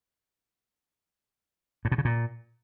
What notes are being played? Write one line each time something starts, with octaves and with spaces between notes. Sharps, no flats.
A2
B2
C#3
A#2